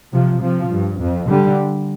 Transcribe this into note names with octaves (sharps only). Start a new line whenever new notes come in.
C3 F3
C3 F3
G2
F2
D3 G3